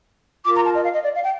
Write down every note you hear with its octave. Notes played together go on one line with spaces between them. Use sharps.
F4 A#4 D6
A#5
A5
D#5
F5
D#5
D5
F5
G5